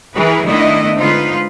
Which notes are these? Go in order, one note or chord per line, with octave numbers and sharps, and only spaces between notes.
E3 G#4 A#4 B4
D#3 A3 B3 D4 E4 D#5
D3 G#3 D#4 F4 B4 C5